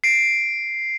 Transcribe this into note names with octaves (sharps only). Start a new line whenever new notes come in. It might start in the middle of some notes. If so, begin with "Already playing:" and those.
C7 D7